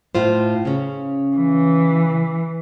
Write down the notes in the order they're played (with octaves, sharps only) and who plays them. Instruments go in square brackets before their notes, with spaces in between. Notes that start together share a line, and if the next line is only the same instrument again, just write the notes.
[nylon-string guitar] A2 F4 C5
C#3 C#4
[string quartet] E3